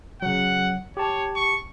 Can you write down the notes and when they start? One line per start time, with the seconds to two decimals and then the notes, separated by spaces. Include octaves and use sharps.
0.22 C#3 F#3 F#5
0.97 G4 C#5 A5
1.36 C#6